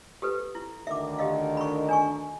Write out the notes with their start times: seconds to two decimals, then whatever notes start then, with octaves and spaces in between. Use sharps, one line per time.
0.22 G4 A4 B4
0.55 E4
0.87 D2 D3 D#3 E5 D6
1.19 G4 D#5 F5
1.57 B5 C#6
1.89 D4 G#5 C#6